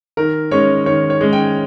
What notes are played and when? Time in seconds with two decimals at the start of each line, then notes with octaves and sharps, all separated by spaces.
0.17 D#3 A#4
0.51 G#3 C#4 C#5
0.86 D#3 C#5
1.10 C#5
1.21 G#3 C#4
1.33 G5